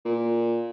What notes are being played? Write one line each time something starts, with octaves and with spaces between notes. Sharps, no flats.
A#2